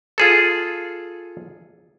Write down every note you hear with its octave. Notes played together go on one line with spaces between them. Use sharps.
F4 G#4 A4